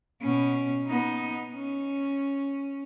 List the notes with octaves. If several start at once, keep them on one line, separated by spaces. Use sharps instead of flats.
B2 C#4
B3 D#4
C#4